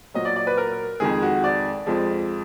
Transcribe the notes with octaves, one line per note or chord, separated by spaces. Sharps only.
A#2 F#3 D#5
D5
D5
B4
A#4
F2 D#3 G#3 G#4
F#4
D5
F2 F3 G#3